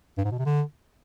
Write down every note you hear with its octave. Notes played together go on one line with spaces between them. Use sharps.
G2
G#2
B2
C3
D3